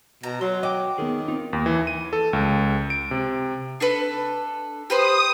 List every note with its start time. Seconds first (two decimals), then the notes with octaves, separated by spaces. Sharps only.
0.23 B2 A#5
0.41 F#3 C6
0.63 D#5 G5 D6
0.98 D#3 B3 G#4
1.28 C4 D#4 F4
1.53 D#2
1.66 E3
1.87 D#7
2.13 A4
2.33 C#2
2.90 D7
3.11 C3
3.80 D4 A4 B4
4.90 G4 B4 C5 D#6